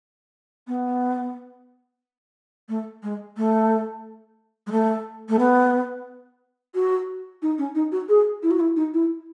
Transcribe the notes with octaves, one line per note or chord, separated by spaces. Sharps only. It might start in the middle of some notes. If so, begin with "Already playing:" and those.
B3
A3
G#3
A3
G#3
A3
A3
B3
F#4
D#4
C#4
D#4
F#4
G#4
E4
F#4
E4
D#4
E4